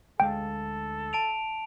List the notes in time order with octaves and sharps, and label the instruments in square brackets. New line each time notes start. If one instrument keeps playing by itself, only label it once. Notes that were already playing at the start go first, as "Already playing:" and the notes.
[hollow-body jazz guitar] D2 G#3 F5 [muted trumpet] A4 [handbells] G5
[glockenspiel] A5 D7 F7